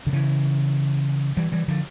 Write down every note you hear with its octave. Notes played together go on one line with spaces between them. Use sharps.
D3
C#3 E3
E3 G3
E3 G3
D3 F3